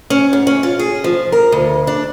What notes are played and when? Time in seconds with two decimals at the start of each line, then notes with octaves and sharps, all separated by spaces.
0.10 C#4
0.33 G#2
0.47 C#4
0.63 F4
0.79 G#4
1.04 F3
1.32 A#4
1.52 D2
1.87 D4